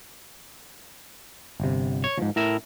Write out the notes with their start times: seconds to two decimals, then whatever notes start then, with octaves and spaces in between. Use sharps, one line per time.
1.60 G1 C3
2.04 C#5
2.18 D2 G#2 F3
2.36 A2 E4 A#4 E5